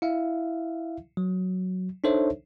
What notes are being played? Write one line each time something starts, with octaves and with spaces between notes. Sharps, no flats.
E4 E5 F5
F#3
D4 D#4 A4 C5 C#5 E5